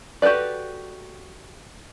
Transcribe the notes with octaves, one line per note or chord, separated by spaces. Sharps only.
F#4 G4 A4 B4 D5